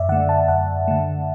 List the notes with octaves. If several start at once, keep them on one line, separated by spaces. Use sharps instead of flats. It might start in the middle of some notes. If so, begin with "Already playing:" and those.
Already playing: F#2 D5 E5
D3 A3 F#5
A5
F#2 F#5
D3 A3